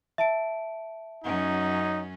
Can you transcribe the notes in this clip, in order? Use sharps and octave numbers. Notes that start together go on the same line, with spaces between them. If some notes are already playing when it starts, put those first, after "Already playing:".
E5 A5 D7
F#2 F#3 C#4 D#4